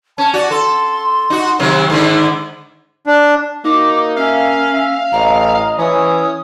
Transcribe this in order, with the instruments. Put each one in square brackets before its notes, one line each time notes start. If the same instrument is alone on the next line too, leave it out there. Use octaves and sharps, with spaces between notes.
[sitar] C#4 [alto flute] A5
[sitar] F#4 [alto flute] D5
[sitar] A4 [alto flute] C6
[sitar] D#4 F#4
C3 D#3 F#3
G#2 D3 D#3
[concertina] D4
[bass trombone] A#3 [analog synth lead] D#4 [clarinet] F#4 [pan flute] D6
[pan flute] C#4 [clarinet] E5 [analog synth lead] F5
[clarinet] E5
[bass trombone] A1 [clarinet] D#5 [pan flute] A#5
[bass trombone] E3 [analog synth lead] C#4 [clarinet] C#5 [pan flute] D#6